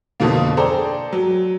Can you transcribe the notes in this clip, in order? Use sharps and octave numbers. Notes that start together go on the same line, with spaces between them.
F2 B2 D3 A#3
G#4 A4 C5 D5 G5 A#5
F#3